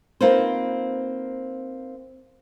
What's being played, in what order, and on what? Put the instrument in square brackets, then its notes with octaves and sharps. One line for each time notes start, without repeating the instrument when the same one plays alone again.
[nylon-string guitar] A#3 C4 D#4 F4 B4 C5